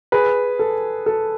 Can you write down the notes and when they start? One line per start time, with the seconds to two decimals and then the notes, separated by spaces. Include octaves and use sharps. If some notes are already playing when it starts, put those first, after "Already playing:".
0.12 G#4 B4
0.59 A4
1.06 A4